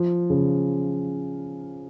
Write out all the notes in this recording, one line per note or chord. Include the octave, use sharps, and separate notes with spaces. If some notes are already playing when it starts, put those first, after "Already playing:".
Already playing: F3
C#3